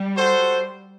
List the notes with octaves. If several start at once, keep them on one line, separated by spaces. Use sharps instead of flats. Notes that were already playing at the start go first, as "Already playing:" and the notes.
Already playing: G3
F#4 A4 C5 F#5